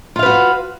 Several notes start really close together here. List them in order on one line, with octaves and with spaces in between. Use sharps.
F4 F5 B4 F#4